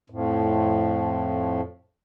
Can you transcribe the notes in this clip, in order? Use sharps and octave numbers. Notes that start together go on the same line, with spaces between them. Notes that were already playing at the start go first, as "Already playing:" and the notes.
F2 A2